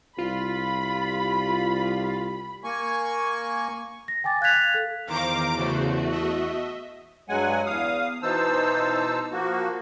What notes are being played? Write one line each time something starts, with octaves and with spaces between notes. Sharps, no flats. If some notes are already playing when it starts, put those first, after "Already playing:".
C2 F4 G4 B5
A#3 G#5 C#6
A#6
G5 G#5 D6 A6
F5 F#6 G#6 A6 B6 F7
A4
E2 D#3 C5 F5 A#5 D6
C#3 A3 F#4 C5
D#5 E5
G2 F#3 G#3 F#5 G#5
E2 F5 D#6
B2 E3 D#4 C5 A5 E6
F3 A#3 F#4